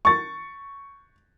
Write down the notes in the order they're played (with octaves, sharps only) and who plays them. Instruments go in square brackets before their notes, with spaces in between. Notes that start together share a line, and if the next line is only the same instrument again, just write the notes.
[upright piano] C#6 A6